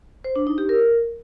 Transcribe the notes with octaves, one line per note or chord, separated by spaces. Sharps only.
C5
D4
D#4
G4
A#4